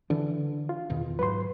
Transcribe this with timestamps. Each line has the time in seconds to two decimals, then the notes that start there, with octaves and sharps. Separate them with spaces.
0.10 D3 E3 D4
0.69 F4
0.90 E2 B2 D#3
1.19 G#2 F#3 B4 C6